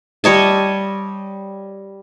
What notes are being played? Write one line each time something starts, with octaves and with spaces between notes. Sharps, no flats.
G3 C#5 D#5 A5